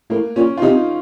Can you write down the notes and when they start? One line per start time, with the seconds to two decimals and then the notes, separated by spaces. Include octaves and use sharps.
0.10 A2 A#3
0.36 A#2 C#4
0.58 F4
0.62 C3 D#4